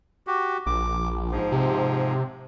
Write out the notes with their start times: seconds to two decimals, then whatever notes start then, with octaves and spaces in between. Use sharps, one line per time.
0.27 F#4 G4
0.66 A#1 D6
1.31 G#2 F3
1.52 C3